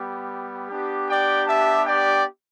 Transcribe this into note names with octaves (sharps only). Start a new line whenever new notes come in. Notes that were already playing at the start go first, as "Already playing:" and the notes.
Already playing: G3 B3 G4
B3 D4 G4
D5 G5
E5 A5
D5 G5